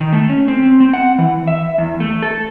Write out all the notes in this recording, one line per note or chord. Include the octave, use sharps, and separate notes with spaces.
D#3
A3
C#4
C4
C4
F#5
E3
E5
E2
A3
A4